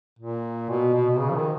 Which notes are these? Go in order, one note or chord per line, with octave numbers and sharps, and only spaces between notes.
A#2
B2
B2
B2
C#3
F3
D#3